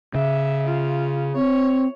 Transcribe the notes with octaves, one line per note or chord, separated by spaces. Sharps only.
C#3 E5
F4
C4 C#5